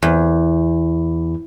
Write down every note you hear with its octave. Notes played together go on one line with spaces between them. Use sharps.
E2